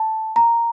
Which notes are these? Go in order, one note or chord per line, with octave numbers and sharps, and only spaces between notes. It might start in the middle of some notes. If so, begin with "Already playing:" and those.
Already playing: A5
A#5